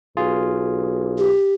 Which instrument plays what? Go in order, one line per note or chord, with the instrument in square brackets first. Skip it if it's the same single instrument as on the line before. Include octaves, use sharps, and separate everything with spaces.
[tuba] B1 [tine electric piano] F4 G#4
[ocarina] G4